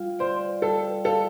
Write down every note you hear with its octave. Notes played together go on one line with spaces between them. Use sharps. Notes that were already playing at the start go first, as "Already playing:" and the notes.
Already playing: G3 F4 F5
C5 D5
G3 A4
A4 F5